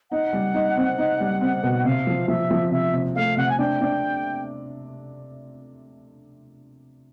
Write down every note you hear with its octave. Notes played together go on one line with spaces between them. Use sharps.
D#4 F#5
G3
D#4
C4
D#4
G3
C4
B2
C3 F5
F3
F3 E5
F3
C3 E5
C3
A3 F5
C3 F#5
G#5
D4 G5
D4